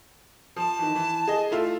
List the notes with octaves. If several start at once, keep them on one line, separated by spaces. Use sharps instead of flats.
F3 A5
D#3 E3
E3
G#4 D#5
A3 E4 F4